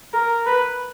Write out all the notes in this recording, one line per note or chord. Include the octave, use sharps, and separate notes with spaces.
A#4
B4